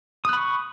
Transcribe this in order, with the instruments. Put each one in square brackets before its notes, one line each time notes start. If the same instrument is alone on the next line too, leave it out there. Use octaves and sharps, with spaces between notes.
[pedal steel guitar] D#6
F#6
B5
C#6